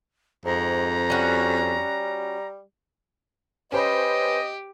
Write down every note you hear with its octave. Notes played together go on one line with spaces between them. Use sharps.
F2 G#2 A#5
G3 C#4 F#4
C#4 G4 B4 C5 D#5 B5